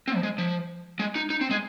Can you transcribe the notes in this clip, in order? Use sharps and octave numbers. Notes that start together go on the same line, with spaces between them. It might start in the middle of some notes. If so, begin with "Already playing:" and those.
C4
F3
G#3
F3
G#3
D#4
D#4
C4
G#3